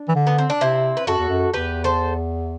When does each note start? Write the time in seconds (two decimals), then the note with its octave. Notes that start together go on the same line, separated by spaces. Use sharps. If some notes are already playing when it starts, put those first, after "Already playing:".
Already playing: D4
0.08 E3
0.15 D3
0.27 B3
0.39 C4
0.50 D4
0.61 C3 C4 E4
0.97 B4
1.07 F#2 F#4 A4
1.18 E2
1.29 F#2
1.54 E2 G4 B4
1.84 A4 C5